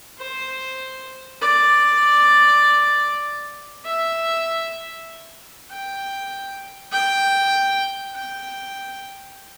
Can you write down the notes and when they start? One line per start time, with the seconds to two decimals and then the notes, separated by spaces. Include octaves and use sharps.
0.19 C5
1.41 D5
3.86 E5
5.70 G5
6.92 G5
8.15 G5